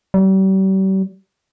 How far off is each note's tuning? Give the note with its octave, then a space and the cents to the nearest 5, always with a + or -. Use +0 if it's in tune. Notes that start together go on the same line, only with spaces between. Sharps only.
G3 -40